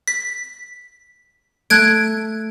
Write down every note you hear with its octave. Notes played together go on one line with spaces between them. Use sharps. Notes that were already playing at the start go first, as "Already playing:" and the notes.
B6
A3 F#6 G#6 D7